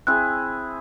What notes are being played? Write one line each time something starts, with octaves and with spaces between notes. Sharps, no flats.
C4 E4 G#4 F#6